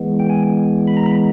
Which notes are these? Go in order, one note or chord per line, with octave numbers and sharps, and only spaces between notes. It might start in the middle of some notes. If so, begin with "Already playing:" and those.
Already playing: E3 G#3 B3
G5
G#5
B5
A#5
B5